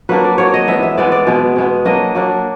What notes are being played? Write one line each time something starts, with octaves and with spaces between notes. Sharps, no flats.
F#3 A#3 D4 B4
D5
F#3 A#3 D4 C#5
D#5
E3 G#3 B3 E5
E5
E3 G#3 B3 D5
D5
B2 G#3 B3
B2 G#3 B3
F#3 A#3 D4 D#5
F#3 A#3 D4